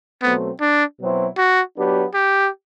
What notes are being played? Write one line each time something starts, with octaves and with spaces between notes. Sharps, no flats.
B2 F#3 A3 B3 C4
D4
B2 F#3 C4 E4
F#4
F#3 B3 D4 G4
G4